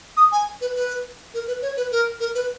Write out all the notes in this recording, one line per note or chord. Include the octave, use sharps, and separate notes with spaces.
D#6
G#5
B4
B4
A#4
B4
C#5
B4
A#4
A#4
B4